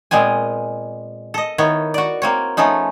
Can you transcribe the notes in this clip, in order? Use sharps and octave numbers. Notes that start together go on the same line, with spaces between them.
A#2 G#3 B3 C4 G#5
A4 D#5
D#3 B3 E4 C#5
F#4 D5
A#3 C4 C#5
F3 A3 B3 C#4 D#4